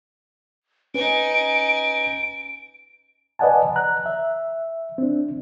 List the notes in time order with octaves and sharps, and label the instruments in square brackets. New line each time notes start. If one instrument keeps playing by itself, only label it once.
[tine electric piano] C#4 B4 [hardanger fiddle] D#4 G#5 [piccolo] D7
[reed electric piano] B4 D5 D#5 F#5 G#5 A5
A#5 F#6
E5
C4 D4